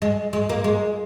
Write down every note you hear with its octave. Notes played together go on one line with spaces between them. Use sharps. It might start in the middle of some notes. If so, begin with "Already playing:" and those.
G#3
G#3
A#3
G#3